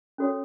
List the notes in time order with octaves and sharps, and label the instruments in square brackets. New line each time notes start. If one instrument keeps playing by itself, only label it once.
[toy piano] C#4 F#4 A4 C#5